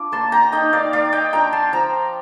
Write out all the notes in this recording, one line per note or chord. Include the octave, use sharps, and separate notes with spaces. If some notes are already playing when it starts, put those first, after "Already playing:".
Already playing: D4 F4 D6
A#3 A5 C6
G5 A#5
D#4 D#5 G5
D5 F5
A#3 D5 F5
D#5 G5
D4 F4 G5 A#5
A5 C6
F3 G5 A#5